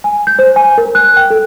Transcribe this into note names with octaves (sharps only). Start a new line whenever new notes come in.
G#5
G6
C5
G#5
A#4
F#6
G5
A4